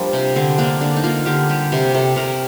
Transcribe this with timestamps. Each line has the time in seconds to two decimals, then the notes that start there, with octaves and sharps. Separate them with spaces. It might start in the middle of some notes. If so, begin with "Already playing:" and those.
Already playing: F3 G3 A#3 D4
0.13 C3
0.36 D3 C4
0.58 A#3 D4
0.81 D3 D4
0.96 D#4
1.03 A#3 F4
1.26 D3 G4
1.49 G3 G4
1.72 C3 G4
1.94 C3 A4
2.16 C3 A#4